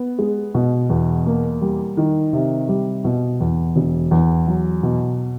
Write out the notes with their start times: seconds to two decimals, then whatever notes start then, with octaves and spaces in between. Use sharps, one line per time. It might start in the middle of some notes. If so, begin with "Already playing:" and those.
Already playing: B3
0.19 G#3
0.55 B2
0.90 E2
1.26 A#3
1.61 G3
1.97 D#3
2.33 C3
2.68 G3
3.04 B2
3.40 E2
3.76 E1
4.11 E2
4.47 F#3
4.83 B2